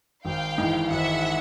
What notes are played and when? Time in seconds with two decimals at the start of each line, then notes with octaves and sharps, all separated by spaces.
0.25 G#1 F5 G5
0.58 G#2 E3
0.90 G#1 E5 F#5